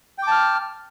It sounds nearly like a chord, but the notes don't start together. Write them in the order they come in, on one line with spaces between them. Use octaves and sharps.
G5 D6 A5 F6